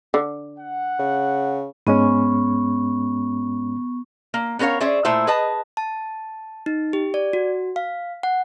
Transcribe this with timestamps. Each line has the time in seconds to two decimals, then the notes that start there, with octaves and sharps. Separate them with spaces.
0.14 D3
0.59 F#5
0.99 C#3
1.87 G#2 G#3 B3 C#4 C#6
4.34 A#3
4.59 B3 C#4 A#4 C#5 F5
4.80 C#4 G#4 C5 D5 E5
5.05 A#2 A3 E4 C5 E5
5.27 G#4 B4 D#5 A5
5.77 A5
6.66 D#4
6.93 G4
7.14 D5
7.33 F#4
7.76 F5
8.23 F#5